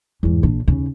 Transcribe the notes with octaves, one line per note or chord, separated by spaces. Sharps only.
E2 G#2
A#1 D4
D#2 C#3